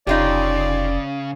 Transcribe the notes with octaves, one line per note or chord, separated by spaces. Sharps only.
F1 C#3 D#4 F4 G4 D5